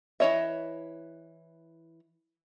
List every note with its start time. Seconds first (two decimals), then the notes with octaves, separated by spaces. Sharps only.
0.20 E3 F#4 C#5 D#5 E5